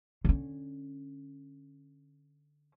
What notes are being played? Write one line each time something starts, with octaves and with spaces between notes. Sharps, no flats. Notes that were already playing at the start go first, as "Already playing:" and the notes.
D3 C#4